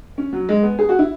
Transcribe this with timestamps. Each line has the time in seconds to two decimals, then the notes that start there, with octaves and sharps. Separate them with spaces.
0.18 C#4
0.33 F#3
0.49 G#3
0.63 B3
0.79 G#4
0.89 F#4
0.99 E4